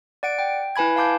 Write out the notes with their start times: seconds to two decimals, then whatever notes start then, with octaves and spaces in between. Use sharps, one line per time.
0.23 D5 F#5 D7
0.39 G5
0.76 E4 B4 G#5 B5 G#6
0.96 F5 A5 D6 G6